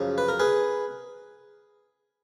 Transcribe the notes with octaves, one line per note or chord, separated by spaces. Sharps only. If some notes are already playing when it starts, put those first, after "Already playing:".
Already playing: F#2 C#3 F3
B4
A#4
G#4 B4